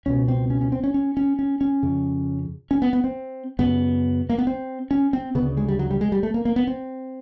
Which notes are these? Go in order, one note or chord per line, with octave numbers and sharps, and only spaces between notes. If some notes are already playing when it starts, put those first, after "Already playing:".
C#2 B2 C#4
C4
C#4
C#4
C4
C#4
C#4
C#4
C#4
C#4
F2 C#3
C#4
B3
B3
C4
F#2 C#3 B3
A#3
B3
C4
C#4
C4
D2 C#3 B3
G#3
G3
F#3
G3
G#3
G3
A3
A#3
A#3
B3
C4